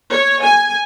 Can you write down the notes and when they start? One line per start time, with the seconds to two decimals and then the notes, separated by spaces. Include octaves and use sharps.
0.11 C#5
0.42 G#5